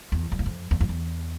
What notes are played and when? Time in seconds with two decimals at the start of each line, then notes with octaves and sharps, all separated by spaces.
0.12 E2
0.32 F2
0.39 E2
0.46 F2
0.71 E2
0.81 F2
0.89 E2